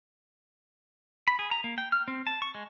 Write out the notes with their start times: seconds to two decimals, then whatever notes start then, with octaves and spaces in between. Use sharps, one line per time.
1.28 B5
1.39 G#4
1.51 A#5
1.64 A#3
1.78 G5
1.92 F6
2.08 C4
2.27 A5
2.42 C#6
2.55 G#3